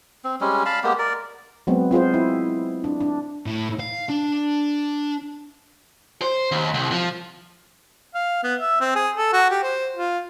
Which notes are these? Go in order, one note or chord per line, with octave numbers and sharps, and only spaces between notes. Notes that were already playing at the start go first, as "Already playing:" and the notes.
C4
G3 G#3 C#4
F5 A5 B5
G#3 A#3 B3 G4
A#4 D5
F#3 G#3 B3 C4
C4 F4 G#4 C5
E4
D4
D4
A2
F5
D4
C5
D#2
C2
F3
F5
B3
E5
C4
G#4
A4
F#4
G4
C5
F4